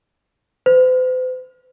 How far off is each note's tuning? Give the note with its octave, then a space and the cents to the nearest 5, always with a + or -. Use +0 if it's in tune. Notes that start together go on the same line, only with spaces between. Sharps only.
C5 -45